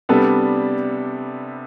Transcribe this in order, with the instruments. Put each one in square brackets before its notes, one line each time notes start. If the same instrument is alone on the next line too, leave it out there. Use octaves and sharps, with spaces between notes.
[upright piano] C3 G3 B3 D4 A4